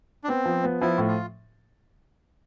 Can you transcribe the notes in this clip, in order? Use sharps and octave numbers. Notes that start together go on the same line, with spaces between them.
D4
B3 C4
F3
B3
F3 E4
A2
F4